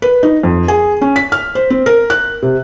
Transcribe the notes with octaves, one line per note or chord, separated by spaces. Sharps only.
B4
D#4
F2
G#4
C#4
B6
F6
C5
C4
A#4
F#6
C3